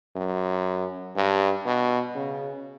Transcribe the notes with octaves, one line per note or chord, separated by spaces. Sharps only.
F#2
G2
B2
C#3